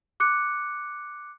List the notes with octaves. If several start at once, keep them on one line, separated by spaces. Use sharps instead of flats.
D6 F#6 C#7